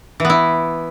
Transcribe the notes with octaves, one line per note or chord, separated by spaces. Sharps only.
E3 B3 E4